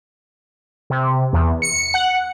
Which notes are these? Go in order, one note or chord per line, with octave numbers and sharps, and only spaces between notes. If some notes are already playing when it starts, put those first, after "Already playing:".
C3
E2
C#7
F#5